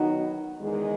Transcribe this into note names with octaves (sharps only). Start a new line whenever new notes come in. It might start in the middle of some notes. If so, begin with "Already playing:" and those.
Already playing: D#3 F#3 B3 D#4 F#4
E2 D#3 G#3